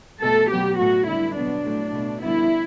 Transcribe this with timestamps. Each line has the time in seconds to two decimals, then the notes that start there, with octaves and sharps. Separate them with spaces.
0.22 B2 A3 A4
0.51 B2 F#3 B3 G4
0.79 A2 F#3 A3 F#4
1.08 D3 G3 B3 E4
1.36 B2 F#3 B3 D4
1.65 A2 F#3 A3
1.94 B2 A3
2.22 D3 G3 B3 E4